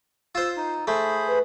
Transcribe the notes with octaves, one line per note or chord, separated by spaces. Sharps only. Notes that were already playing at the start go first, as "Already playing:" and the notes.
F4 C5 E6
D#4
A3 G#4 C5 B5
B4